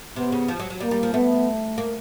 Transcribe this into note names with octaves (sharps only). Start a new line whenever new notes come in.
C3 B3
C#3
F3
F#3
F#3
G3 A#3
G3
F3
A3 B3
A#3